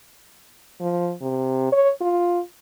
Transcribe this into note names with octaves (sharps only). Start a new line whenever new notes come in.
F3
C3
C#5
F4